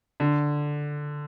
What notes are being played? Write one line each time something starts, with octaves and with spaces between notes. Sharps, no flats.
D3